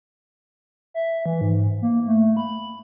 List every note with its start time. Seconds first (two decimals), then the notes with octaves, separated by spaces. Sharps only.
0.94 E5
1.26 E3
1.41 G#2
1.82 A#3
2.07 A3
2.37 B5